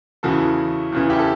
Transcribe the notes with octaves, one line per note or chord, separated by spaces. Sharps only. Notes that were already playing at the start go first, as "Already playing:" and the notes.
E2 C#3 E3 F#4 A4
E2 C#3 E3
E4 G4
A4